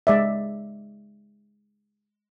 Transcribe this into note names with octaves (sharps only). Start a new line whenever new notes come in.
G#3 D5 E5